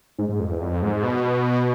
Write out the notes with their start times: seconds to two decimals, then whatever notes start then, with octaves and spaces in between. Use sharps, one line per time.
0.19 G#2
0.29 G#2
0.40 F2
0.51 E2
0.61 F2
0.82 G#2
1.03 B2